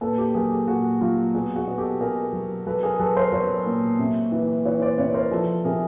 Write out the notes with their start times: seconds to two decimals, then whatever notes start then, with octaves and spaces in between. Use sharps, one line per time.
0.01 A#2 A4 B4
0.18 G4 A4
0.34 F#3 G#4 A#4
0.52 G4 A4
0.68 A#2 F#4 G#4
1.01 F#3 F4 G4
1.34 B2 F#4 G#4
1.56 F#4 G#4
1.68 B2
1.78 G4 A4
2.00 B2 G#4 A#4
2.33 F#3
2.66 F#3 A4 B4
2.83 G#4 A#4
2.99 F#3 A4 B4
3.16 A#4 C5
3.32 F#3 B4 C#5
3.66 A#2
3.99 C3
4.32 E3
4.65 E3 B4 C#5
4.82 C5 D5
4.98 C3 B4 C#5
5.14 A#4 C5
5.31 F3 A4 B4
5.64 C3 G#4 A#4